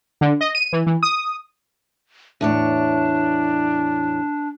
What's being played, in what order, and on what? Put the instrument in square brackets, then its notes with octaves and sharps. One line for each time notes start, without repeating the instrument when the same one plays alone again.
[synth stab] D3
D#5
D#7
E3
E3
D#6
[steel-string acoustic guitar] E2 A2 C#5 [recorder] D4